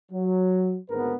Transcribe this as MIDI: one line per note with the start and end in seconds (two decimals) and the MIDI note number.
0.11 0.77 54
0.90 1.14 32
0.90 1.14 38
0.90 1.14 44
0.90 1.14 59
0.90 1.14 70
0.90 1.14 71